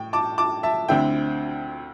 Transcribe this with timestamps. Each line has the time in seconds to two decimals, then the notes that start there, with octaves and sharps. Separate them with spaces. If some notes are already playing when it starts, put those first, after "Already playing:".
Already playing: A2 G5
0.13 A5 D6
0.38 A5 D6
0.63 E5 A5
0.89 D2 D3 C4 E4 G5